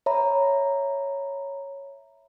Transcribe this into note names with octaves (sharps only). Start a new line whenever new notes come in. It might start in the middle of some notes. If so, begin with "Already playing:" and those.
C#5 E5 A#5 B5